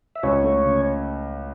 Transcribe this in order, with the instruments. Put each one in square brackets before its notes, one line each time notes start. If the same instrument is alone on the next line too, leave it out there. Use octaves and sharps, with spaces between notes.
[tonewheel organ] E5
[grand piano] C#2 [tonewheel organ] C#5
[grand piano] A3
C#3